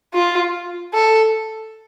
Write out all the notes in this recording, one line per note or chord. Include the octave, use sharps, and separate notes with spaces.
F4
A4